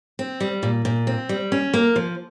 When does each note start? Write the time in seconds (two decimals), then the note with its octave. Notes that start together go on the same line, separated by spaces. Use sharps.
0.19 C4
0.40 G3
0.63 A#2
0.85 A#2
1.07 C4
1.29 G3
1.52 C#4
1.74 A#3
1.96 F3